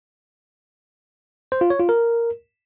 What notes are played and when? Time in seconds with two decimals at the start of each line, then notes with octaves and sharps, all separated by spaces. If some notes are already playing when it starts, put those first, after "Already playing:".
1.52 C5
1.61 F4
1.70 C#5
1.80 F4
1.89 A#4